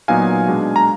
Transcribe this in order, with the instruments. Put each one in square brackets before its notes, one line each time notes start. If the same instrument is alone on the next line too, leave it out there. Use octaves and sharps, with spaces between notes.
[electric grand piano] A#2 F#3 B3 D#4 F5 G#5
B2 G#3 D4
A#5